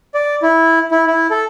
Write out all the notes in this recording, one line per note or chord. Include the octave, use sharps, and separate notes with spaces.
D5
E4
E4
E4
A4